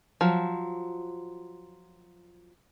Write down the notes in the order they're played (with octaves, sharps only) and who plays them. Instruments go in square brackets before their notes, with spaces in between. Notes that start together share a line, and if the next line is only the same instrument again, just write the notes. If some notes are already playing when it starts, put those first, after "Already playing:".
[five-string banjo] F3 F#3